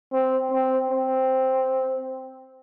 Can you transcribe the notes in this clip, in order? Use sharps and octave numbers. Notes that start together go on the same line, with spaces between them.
C4
C4
C4